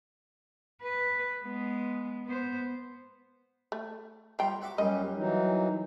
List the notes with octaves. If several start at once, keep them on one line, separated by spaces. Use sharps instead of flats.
B4
G#3 B3
B3 C5
A3
F3 G3 G5 A#5 C6
F#4 E5 D6
F#2 A#2 G3 C#4 G4 D#5
E3 F#3 D#4